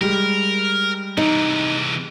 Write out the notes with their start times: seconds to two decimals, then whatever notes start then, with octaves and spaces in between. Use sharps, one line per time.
0.01 G3 G#3 A#4
1.17 C3 E3 D#4